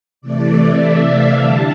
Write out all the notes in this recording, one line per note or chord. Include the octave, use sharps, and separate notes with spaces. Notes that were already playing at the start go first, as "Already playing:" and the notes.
C3 E3 A3 D5
E5
F5
D3 G3 D4 A5